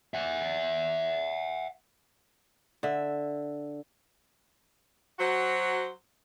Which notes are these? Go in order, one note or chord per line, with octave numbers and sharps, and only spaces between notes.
E5 F#5
D3 E5
F#3 F#4 C5